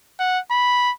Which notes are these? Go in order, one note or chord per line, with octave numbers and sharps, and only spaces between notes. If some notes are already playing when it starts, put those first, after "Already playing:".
F#5
B5